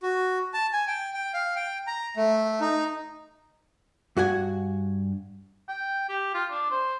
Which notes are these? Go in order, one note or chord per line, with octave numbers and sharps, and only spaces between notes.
F#4
A5
G#5
G5
G5
F5
G5
A#5
A3
D#4
G2 F#4 F#5 G#5
G5
G4
F4
D4
C5